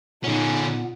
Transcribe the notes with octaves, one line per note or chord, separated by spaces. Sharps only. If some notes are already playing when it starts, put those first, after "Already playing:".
A#2 D3 B3 C#4 D#4